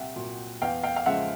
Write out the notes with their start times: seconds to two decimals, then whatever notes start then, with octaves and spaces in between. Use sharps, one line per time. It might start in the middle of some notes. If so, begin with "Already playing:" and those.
Already playing: C2 A#2 E5 F#5 G5
0.16 A#2 F#3
0.61 E2 F5 G5
0.83 F5 G5
0.96 F5
1.06 C#3 F3 G#3 E5 F#5